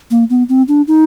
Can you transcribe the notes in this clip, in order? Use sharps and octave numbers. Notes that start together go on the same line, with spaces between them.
A#3
B3
C4
D4
D#4